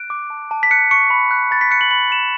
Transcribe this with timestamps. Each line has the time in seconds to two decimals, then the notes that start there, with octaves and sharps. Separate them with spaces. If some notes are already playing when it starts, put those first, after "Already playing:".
Already playing: F#6 D7
0.10 D6
0.30 A5
0.51 A5
0.63 B6
0.71 F#6 C#7
0.91 C#6 C#7
1.10 B5
1.31 F#6
1.51 B5 A6
1.61 B6
1.71 F#6 C#7
1.81 F#7
1.91 B5 F#7
2.11 F#6 E7